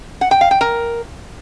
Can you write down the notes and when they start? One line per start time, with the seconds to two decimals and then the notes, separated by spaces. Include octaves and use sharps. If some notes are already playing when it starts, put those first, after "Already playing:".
0.21 F#5
0.31 G5
0.41 F5
0.51 G5
0.61 A#4